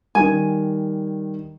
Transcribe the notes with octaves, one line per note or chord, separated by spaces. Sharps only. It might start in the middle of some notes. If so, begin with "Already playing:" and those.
D#3 G3 G#5